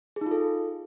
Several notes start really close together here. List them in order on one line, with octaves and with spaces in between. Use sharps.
G#4 D#4 F4 A4